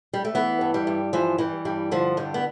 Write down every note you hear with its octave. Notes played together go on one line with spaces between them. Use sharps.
G3
A3
E3 B3
G2
G3
G2
E3 F3
E3 G3
G2 G3
D3 F3
G2 G3
B3